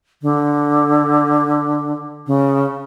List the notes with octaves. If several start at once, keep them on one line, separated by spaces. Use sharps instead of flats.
D3
C#3